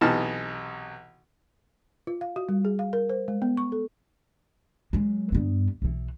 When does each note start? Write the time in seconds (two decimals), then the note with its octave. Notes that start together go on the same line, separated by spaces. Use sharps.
0.01 B1 C3 E3 D#4 A5 F6
2.07 F4
2.21 F5
2.36 F#4
2.49 G3
2.65 G#4
2.79 F5
2.93 A#4
3.10 C5
3.28 G#3
3.42 B3
3.57 C#6
3.72 A4
4.93 F#3 G#3
5.32 G2 B3
5.82 B1 E3